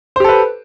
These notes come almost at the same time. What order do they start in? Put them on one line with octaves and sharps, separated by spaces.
C5 G4 A4 B4